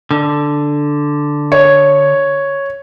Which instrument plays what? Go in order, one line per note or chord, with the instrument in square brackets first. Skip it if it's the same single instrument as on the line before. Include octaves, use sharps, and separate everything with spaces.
[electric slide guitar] D3
[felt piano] C#5